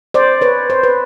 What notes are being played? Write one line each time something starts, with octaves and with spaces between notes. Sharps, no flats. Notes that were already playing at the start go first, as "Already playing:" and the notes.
C5 D5
B4 C#5
C5
B4